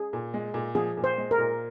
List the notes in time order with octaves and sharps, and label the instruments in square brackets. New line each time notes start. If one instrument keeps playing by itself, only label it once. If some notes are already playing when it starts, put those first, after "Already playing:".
Already playing: [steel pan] G#4
[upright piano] A#2
G#3
A#2
[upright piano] F3 [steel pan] G#4
[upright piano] A#2
[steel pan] C5
[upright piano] G#3
[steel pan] A#4
[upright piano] A#2